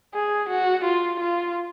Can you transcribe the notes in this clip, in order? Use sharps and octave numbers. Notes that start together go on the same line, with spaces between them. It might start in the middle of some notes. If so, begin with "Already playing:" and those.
G#4
F#4
F4
F4